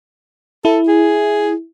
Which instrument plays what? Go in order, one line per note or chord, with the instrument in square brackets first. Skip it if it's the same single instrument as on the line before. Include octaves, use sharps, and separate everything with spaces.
[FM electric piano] E4 [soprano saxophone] A4
[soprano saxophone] G#4